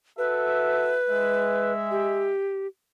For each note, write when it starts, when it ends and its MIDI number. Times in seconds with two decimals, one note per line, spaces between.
0.18 0.98 66
0.18 0.98 69
0.18 1.72 71
0.18 0.98 76
1.08 2.35 56
1.08 2.35 76
1.91 2.67 67